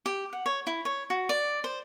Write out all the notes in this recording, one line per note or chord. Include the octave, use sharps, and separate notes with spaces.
G4
F#5
C#5
E4
C#5
F#4
D5
C5